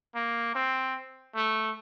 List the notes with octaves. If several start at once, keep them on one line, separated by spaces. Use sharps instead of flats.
A#3
C4
A3